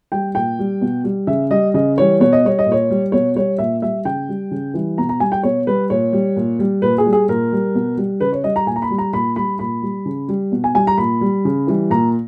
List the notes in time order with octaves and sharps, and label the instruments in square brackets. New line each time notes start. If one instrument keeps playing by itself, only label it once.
[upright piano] G3 G5
A#2 G5
G3
B2
G3
C#3 E5
G3 D#5
C#3 D#5
E3 G3 C#5
B2 C#5
D#5
G3 C#5
D#5
A#2
C#5
G3
B2 C#5
G3 C#5
A#2 E5
G3 E5
C#3 G5
G3
C#3
E3 G3
B2 A#5
A#5
G3 G#5
G5
B2 C#5
G3 B4
A#2 C#5
G3
A#2
G3
A#2 B4
G#4
G3
G#4
A#2 A#4
G3
B2
G3
C#3 B4
C#5
G3 D#5
A#5
A#2 G#5
A#5
B5
G3
A#5
A#2 B5
G3 B5
A#2 B5
G3
C#3
G3
B2
G#5
G3 G#5
A#5
A#2 B5
G3
C#3
E3 G3
A#2 A#5